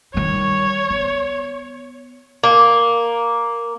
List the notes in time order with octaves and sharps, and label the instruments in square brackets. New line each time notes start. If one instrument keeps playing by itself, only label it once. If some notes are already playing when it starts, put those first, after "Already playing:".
[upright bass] D#3 G3 [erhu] C#5
[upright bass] B3
[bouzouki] A#3